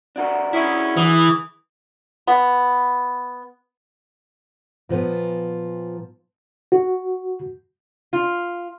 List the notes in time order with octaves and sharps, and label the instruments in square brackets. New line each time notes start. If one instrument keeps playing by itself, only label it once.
[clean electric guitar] D4 F#4 A#4
[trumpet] C#4 [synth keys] E4 G#4
[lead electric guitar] E3 [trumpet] D#6
[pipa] B3
[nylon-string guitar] A#2 F3 B3
[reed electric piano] F#4
[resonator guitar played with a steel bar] F4